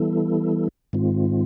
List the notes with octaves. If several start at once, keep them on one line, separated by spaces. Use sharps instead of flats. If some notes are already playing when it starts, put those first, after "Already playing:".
Already playing: E3 G3 B3 E4 A4
G#2 D#3 G#3 C4 F4